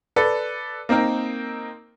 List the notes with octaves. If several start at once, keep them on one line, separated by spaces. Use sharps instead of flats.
A4 B4 D5
A#3 C4 D#4 A#4